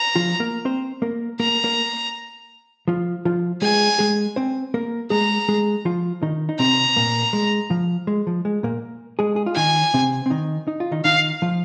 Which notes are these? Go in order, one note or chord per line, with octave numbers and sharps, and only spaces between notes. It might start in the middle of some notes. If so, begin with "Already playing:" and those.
Already playing: A#5
F3 F4
A#3 A#4
C4 C5
A#3 A#4
A#3 A#4 A#5
A#3 A#4
F3 F4
F3 F4
G#3 G#4 G#5
G#3 G#4
C4 C5
A#3 A#4
G#3 G#4 A#5
G#3 G#4
F3 F4
D#3 D#4
D#4
C3 C4 A#5
A#2 A#3
G#3
F3
G#3
F3
G#3
A#2 A#3
G#3 G#4
G#4
F4
D#3 D#4 G#5
C3 C4
C4
D#3 D#4
D#4
F4
D#3 D#4
D#3 D#4 F5
F3 F4